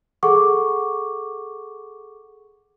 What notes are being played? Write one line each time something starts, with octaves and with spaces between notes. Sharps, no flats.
G#4 A4 F#5 C#6 D6